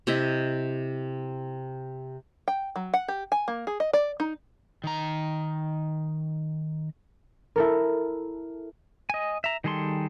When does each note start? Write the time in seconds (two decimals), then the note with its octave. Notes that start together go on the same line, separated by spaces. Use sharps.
0.07 C3 E4 D#5 E5
2.48 G5
2.76 F#3
2.94 F#5
3.08 G4
3.32 G#5
3.48 A#3
3.67 G#4
3.80 D#5
3.93 D5
4.20 D#4
4.84 D#3 A#5
7.56 E4 A4 A#4
9.10 D#5 G#5
9.44 E5 A#5
9.64 D#3 G3 G#4 A4 C6